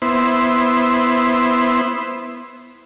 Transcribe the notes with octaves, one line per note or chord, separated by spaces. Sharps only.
B3 E4 C5